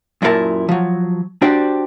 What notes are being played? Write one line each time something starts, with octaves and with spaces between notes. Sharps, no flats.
F#2 A#2 E4 F4 A#4 A5
F3 F#3
D4 F#4 G4 C5 D5